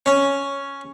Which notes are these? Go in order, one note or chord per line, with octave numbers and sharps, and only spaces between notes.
C#4